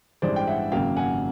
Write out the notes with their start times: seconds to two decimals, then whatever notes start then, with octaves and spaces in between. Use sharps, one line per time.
0.22 A1 G2 E3 G#3 C5 D5
0.36 G5
0.47 E5 F#5
0.72 G#1 F#2 C#3 F#3 A#3 F5 G5
0.97 F#5 G#5